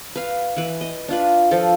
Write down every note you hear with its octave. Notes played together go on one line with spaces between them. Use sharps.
B4 F5
E3 B4
D#5
D4 F4 B4
F3 A4